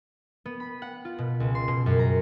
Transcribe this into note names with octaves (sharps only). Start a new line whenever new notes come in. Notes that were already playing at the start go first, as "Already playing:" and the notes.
B3
B5
F#5
F4
B2
C#2
C6
B2
F#2
A#5